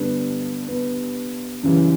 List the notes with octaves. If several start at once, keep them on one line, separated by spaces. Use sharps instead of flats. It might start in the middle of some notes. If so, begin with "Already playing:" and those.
Already playing: G2 D3 G3 B3
B3
F#2 C#3 E3 G3